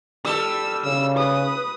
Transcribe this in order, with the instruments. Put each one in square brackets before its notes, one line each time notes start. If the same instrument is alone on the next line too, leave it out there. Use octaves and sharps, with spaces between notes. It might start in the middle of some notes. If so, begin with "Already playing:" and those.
[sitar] G3 A4 [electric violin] E6
[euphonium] C#3 [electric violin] E6
[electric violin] B4 D#6